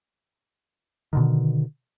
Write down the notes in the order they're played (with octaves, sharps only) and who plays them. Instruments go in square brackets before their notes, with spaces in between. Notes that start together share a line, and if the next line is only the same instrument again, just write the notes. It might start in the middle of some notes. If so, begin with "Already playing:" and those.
[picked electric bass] B2 D3 D#3